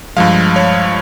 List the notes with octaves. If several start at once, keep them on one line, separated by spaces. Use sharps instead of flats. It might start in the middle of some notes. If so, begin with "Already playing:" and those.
G2 F3 G#3 F5
C#5